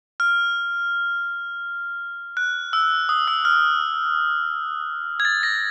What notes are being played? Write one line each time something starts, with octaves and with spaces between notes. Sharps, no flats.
F6
F#6
E6
D#6
E6
F6
G#6
A6
A#6